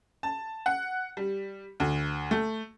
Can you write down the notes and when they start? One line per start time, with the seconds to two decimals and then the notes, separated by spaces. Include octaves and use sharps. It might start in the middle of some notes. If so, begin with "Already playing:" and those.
0.23 A5
0.66 F#5
1.17 G3
1.80 D2
2.31 A3